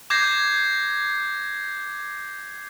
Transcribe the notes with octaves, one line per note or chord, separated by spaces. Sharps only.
D6 G6 G#6 A#6 C7